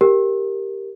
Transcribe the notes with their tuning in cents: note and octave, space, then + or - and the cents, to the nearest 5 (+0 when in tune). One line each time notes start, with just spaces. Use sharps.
G4 +0 A#4 +0